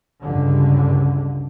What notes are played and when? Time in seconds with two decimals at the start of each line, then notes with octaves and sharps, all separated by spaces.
0.21 C#2 G2 D3